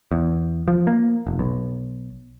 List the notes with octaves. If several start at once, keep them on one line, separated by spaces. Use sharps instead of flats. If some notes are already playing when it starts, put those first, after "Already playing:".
E2
F3
A#3
F1
B1